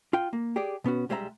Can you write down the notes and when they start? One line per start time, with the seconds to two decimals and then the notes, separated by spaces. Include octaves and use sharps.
0.13 F4 G5
0.33 A#3
0.56 G4 G#4 D5
0.84 B2 B3 C#4 F#4
1.09 B1 G3 G#3 C#5 E5 A#5